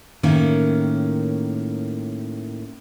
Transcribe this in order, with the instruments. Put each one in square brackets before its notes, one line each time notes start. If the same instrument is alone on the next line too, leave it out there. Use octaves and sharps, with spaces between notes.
[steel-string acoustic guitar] A2 D#3 A#3 C#4